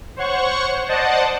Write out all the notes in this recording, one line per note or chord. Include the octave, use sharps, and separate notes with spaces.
C5 C#5 F#5 C#6
C5 D5 D#5 F#5 A5